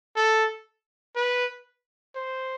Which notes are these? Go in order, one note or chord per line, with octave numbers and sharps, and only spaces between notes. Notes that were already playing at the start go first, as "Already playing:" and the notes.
A4
B4
C5